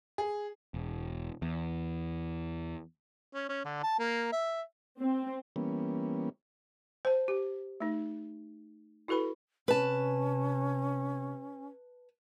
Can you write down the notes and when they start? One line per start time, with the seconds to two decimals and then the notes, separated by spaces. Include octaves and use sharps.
0.18 G#4
0.74 E1
1.42 E2
3.33 C#4
3.49 C#4
3.65 D3
3.83 A5
3.99 A#3
4.32 E5
4.99 C4
5.56 E3 G3 A#3 B3 C#4
7.05 C5 A5
7.28 G4
7.80 A3 D#4
9.08 E4 F#4 A4 B4 B5
9.68 C3 C#4 B4 A5